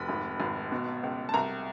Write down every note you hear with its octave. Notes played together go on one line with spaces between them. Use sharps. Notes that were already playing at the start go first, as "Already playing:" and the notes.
Already playing: F1 B5
G#1
G#1
B2
C#2
A5
C2 A#5